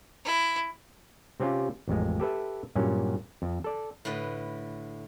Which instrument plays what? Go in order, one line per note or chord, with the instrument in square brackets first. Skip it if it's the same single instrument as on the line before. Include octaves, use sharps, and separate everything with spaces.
[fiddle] E4
[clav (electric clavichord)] C3 C4 C#4 F4 G4
A1 F2 G#3
G4 A4 B4 E5
G2 A#2 F#3 C#4
F2
A4 D5
[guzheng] A2 D3 B4 D#5